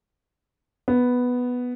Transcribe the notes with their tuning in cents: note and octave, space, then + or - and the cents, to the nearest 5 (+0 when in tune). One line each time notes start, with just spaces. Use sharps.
B3 +0